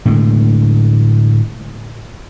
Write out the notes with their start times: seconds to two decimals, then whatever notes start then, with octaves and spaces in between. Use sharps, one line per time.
0.05 A2 D3 G#3